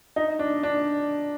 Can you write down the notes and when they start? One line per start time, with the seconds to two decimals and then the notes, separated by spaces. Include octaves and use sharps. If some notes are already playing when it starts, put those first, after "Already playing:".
0.16 D#4
0.39 D4
0.63 D4